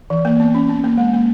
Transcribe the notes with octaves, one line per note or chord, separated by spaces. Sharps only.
E3
A#3
B3
C#4
B3
A#3
G#3
A#3